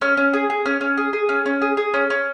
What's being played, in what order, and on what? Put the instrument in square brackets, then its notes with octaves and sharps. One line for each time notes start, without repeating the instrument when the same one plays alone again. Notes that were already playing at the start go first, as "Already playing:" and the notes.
[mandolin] C#4 F6
C#4
G#4
G#4
C#4 F6
C#4
G#4
G#4
C#4
C#4
G#4
G#4
C#4
C#4